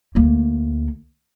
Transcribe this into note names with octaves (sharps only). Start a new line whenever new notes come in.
D2 A#3